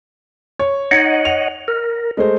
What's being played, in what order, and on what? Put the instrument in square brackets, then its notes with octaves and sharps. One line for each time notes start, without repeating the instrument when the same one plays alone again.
[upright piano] C#5
[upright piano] D#4 [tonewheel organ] C#5 D#5 F#5
[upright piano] F7
[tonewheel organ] A#4
[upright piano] G#3 A3 C5